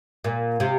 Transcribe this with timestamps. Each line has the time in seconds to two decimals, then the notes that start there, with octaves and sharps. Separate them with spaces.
0.24 A#2
0.60 C3